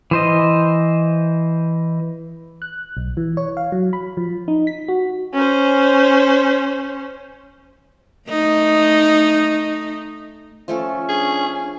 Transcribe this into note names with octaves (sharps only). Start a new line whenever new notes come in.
E3 C5 D#5
F#6
B1
E3
C#5
F5
F#3
B5
F3
D#4
B6
F#4
C#4 C5
A3 D#4
F3 A3 C#4 A4
D4 G#4